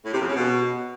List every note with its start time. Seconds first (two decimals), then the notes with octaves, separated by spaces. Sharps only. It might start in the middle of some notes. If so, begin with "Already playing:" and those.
0.05 A2
0.13 C3
0.21 F2
0.28 C#3
0.36 B2